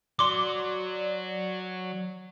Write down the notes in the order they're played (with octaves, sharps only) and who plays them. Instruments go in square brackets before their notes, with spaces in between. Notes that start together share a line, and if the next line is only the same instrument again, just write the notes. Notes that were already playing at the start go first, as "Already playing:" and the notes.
[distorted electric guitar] F#3 [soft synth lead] D5 [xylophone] C6 D6